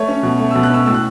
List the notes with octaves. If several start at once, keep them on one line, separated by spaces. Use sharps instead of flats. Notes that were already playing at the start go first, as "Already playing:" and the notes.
Already playing: A3 C#5
C#4
B2
A3
B2 E6
F#6
C#4 E6
A2 E6
F#6